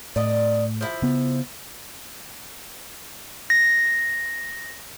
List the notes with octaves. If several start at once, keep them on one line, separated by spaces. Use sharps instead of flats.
A2 D5 D#5
F3 E4
C#3 B3
A#6